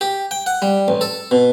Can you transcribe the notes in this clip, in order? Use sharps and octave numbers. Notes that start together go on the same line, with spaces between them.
G4
G5
F#5
G3
A1
A4
B2